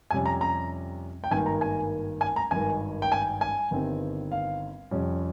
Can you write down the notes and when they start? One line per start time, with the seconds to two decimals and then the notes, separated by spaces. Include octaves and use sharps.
0.11 F2 C3 G3 C#4 G#5
0.26 A#5
0.41 A#5
1.24 G5
1.31 G#1 G2 D#3 A#3 G#5
1.46 A#5
1.61 G#5
2.21 G#5
2.36 A#5
2.51 G#1 G2 D#3 G#5
3.02 G5
3.12 G#5
3.41 G#5
3.71 G1 G2 D#3 G3 C4
4.32 F5
4.91 F2 C3 G3 C#4